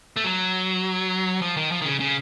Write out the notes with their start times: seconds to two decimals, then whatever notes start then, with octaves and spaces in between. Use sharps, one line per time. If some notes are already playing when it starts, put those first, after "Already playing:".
0.16 A3
0.24 F#3
1.42 F3
1.57 D#3
1.72 F3
1.82 D#3
1.86 C#3
2.00 C#3